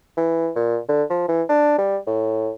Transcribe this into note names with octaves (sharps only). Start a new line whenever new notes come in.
E3
A#2
D3
F3
E3
D4
G3
A2